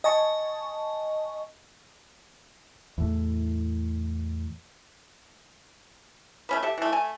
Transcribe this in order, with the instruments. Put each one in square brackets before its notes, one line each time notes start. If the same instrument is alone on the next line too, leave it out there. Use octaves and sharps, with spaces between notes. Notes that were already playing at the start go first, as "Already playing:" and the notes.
[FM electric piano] D#5 G#5 A5 C#6
[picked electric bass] E2 A2
[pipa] A3 C#4 B4
G4 A4 E5
E3 A3
A3 G#5